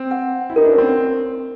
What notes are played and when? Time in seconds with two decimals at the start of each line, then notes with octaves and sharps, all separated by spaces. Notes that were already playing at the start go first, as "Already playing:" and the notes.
Already playing: C4
0.11 F#5
0.50 E4
0.56 D#4 A#4
0.65 D4
0.72 C#4
0.78 C4